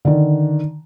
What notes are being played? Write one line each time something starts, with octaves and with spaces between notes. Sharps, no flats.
D3 D#3